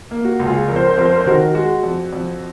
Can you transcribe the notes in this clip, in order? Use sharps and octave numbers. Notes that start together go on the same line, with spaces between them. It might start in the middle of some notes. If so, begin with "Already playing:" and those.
A#3
F#4
C#2
F4 G#4
F2 A#4
C5
A#4
C5
F2 A#4
C5
A#4
C5
D#3 F#4 A#4
G#3 F#4
F2
F2